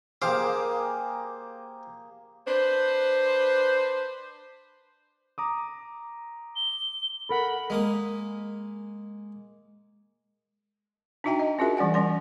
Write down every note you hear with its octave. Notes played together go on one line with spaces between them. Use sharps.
A#3 G4 G#4 C5 F5 D6
D4 B4 C5
A#5 D6 D#6
G7
A4 A#4 F#5 B5
G#3 A#3 D#6
D4 D#4 F#4 E5 G5 A#5
D#5
C#4 F4 F#4 G#4 A#4 E5
E3 G3 D5 F#5 G#5
G3 C#4 C6